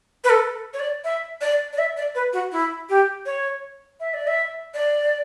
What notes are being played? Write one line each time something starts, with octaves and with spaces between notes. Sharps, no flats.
B4
A4
C#5
D5
E5
D5
D5
E5
D5
B4
F#4
E4
G4
C#5
E5
D5
E5
D5